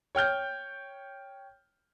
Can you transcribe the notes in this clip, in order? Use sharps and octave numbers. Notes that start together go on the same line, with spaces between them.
C#5 G5 F6 G6